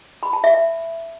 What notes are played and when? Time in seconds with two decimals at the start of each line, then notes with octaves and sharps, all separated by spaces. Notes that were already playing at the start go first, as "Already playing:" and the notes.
0.23 B5
0.33 A5
0.44 E5
0.54 E5